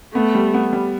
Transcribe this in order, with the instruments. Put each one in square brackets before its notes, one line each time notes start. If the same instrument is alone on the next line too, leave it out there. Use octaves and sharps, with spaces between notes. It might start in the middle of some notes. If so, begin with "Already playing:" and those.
[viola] A3 [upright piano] B3
[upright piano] G3
B3
G3